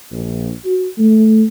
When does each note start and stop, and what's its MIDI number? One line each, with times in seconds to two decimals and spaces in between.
0.11 0.50 34
0.65 0.86 66
0.99 1.44 57